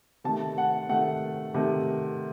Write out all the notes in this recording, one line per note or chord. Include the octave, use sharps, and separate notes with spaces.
C3 D#3 A3 A5
F#5
C3 D#3 A3 F#5
C3 D#3 A3